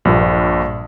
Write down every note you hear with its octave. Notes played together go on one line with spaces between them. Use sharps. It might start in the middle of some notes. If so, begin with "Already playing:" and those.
A#1 G2 A#2